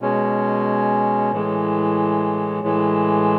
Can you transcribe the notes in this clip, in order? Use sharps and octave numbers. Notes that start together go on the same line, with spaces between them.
B2 G#3 C#4
A2 E3 G#3
A2 E3 G#3